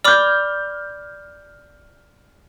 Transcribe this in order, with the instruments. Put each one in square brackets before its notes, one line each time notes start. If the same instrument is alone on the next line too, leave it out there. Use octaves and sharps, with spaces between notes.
[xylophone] D5 B5 D6 [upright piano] F6 G6